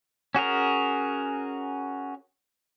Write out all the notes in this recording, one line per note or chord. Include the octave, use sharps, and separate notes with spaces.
C#4 F#4 G#4 A#4